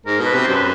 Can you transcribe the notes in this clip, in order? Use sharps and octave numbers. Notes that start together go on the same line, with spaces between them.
G#2 A#4
B2 B4
C3
C5
F#2
B4